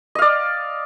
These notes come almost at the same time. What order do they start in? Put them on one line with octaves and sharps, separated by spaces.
D#5 F5 D5